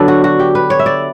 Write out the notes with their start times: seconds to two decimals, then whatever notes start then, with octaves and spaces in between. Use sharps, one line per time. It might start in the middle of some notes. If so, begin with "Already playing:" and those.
Already playing: D3 F#3 B3 D4 A4
0.08 F#4
0.24 F#4
0.40 G4
0.55 B4
0.70 C#5
0.79 E5
0.86 D5